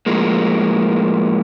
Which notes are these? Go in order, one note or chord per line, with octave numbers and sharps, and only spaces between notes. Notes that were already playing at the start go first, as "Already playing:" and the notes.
A2 F3 G#3 A#3